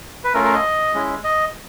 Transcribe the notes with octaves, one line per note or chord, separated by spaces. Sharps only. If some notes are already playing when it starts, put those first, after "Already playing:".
B4
A3 C#4 F4 A#4
A#4
D#5
G#3 C#4 E4
D#5